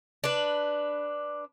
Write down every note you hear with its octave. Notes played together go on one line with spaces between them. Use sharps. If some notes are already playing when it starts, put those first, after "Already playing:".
D4 B4